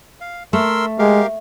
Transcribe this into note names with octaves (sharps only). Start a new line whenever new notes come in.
F5
A3 A#4 C6 E6
G#3 G4 A#4 F5